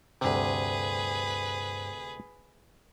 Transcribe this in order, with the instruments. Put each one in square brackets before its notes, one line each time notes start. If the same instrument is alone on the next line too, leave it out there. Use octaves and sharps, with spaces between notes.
[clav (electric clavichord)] D2 C3 [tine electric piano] G2 C5 [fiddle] G#4 B4